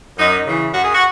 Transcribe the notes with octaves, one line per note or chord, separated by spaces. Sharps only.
F#2 D#4
C#3 E3
F#2 F#4
G#4
F#4